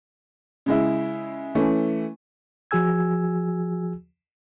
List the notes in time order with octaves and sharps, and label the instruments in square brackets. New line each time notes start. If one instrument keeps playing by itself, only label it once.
[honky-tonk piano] C#3 G#3 E4
E3 A3 C#4
[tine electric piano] F3 F#4 G#4 G#5 E6 G#6